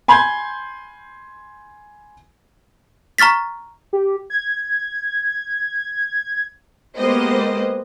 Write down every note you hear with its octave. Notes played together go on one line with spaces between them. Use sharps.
G#5 B5 C6 G6 G#6
A#5 C#6 F6 A6 B6
G4
G#6
G#3 A#3 B3 G4 C5 D#5